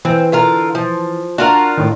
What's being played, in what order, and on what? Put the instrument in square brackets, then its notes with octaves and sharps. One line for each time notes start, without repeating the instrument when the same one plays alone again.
[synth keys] E3 [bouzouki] C4
[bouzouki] D3 F4 A#4
F3
[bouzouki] D4 F4 A#4 [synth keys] F#4
[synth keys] A2 D#3